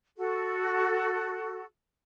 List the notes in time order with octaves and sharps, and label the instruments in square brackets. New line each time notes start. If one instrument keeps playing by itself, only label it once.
[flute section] F#4 A4